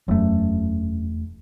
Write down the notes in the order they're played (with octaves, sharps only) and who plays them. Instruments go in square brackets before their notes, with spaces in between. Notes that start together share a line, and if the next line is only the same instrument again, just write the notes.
[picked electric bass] E1 A3 [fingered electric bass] F#2